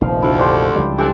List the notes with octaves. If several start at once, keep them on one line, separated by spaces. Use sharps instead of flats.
F1 A#1 D#3 F3 F5
D2 E4
D4 G4 C5
C#2 F3 G3
C3 E3 D4 G4 A4 D#6